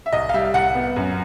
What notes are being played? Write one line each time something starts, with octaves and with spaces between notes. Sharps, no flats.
E5
C2 D#5
F5
G3 E5
C2 F#5
B3
F#2